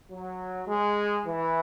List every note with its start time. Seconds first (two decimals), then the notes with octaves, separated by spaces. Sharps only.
0.11 F#3
0.68 G#3
1.26 E3